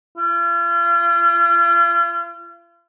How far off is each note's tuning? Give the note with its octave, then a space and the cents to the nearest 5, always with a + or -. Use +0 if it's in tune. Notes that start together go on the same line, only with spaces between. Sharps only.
F4 -40